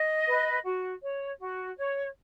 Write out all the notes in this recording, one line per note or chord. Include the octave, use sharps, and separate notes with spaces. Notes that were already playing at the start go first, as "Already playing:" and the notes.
Already playing: D#5
B4
F#4
C#5
F#4
C#5